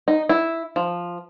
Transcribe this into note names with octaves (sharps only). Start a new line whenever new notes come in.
D#4
E4
F3